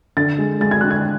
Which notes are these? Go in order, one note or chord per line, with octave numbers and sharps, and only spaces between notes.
D3 A6
G#3
G#3 A6
G#6
D3 F#6
G#6